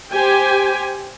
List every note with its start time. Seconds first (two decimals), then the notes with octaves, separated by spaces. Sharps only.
0.13 G4 C5 G5 G#5